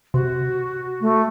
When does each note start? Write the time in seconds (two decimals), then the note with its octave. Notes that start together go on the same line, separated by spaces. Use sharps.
0.14 C3 F#4
1.01 A3